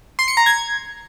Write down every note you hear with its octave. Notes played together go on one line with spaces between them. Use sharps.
C6
C#7
A#5
G#6